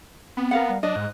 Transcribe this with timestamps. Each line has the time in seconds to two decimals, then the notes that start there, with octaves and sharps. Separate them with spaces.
0.37 B3 C4
0.51 A#4 F5 F#5
0.70 G3
0.83 F#3 D4 D#5
0.96 G#2 F#6